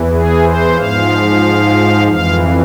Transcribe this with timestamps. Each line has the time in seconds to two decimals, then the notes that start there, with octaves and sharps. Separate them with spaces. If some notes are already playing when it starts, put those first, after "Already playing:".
Already playing: E2 E3
0.10 G#4
0.43 C5
0.76 G#2 F3 F5
2.08 F2 E3 F5